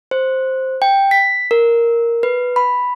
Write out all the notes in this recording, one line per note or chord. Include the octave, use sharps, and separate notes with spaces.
C5
G5
B6
A#4
B4
B5